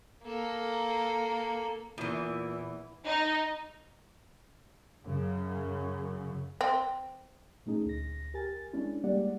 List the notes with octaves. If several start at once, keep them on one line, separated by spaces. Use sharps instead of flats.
A#3 A4
E2 A#2 E3 E4
D#4
F#2 C#3
C4
A#2 A3 C#4 D#4 G#4
D2 A#6
G4 A#4 G#5 A6
G#3 C#4 D4 E4
G3 G#3 A#3 G4 D5 F#5